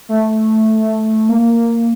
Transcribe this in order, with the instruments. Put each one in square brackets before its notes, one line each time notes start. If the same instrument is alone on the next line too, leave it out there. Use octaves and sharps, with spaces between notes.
[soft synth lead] A3
A#3